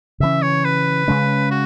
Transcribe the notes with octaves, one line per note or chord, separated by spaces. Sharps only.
C#3 E3 C#4 E5
C#5
B4
C#3 G#3 C#4
F#4